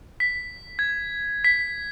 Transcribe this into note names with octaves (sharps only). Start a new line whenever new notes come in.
B6
G#6
B6